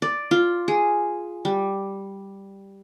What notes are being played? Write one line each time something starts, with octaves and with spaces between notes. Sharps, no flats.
D5
F4
G#4
G3